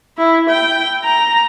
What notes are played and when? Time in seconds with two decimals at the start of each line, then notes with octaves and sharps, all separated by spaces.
0.18 E4
0.50 G5
1.04 A#5